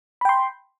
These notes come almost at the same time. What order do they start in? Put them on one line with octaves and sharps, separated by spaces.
B5 G5 C6